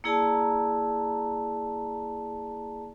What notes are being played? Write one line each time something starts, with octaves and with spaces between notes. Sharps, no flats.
A#3 E4 G#4 D5 A5 A#5